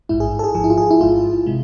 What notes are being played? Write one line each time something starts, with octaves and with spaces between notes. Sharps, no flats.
A1 G#2 G#3 E4
G#4
A4
G#4
G#1 G#2 F3 G#4
E4
F4
G#4
E4
G#1 G#2 G#3 F4
C3 G#3